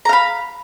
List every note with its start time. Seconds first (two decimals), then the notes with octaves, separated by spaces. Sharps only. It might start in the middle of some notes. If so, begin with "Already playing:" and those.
0.05 A#5
0.09 F5
0.13 B5